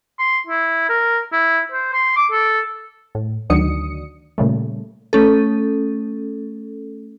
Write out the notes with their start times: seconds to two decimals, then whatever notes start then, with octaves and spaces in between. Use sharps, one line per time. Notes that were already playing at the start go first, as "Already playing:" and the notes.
0.19 C6
0.47 E4
0.89 A#4
1.32 E4
1.72 C5
1.94 C6
2.16 D6
2.32 A4
3.15 A2
3.50 D2 D#3 F#3 D4 D#6 C#7
4.38 A#2 C#3 G3 A3
5.13 A3 C#4 A4